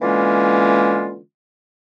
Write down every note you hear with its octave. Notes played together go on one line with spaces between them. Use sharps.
D3 E3 G#3 A#3 C#4 F4